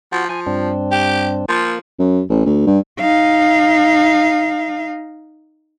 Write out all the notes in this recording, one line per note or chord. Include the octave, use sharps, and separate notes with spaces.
F3 F#4
F3 G#5
G2 C4 D4
G4
F3 A#3
F#2
A1
D2
G2
D#4 F5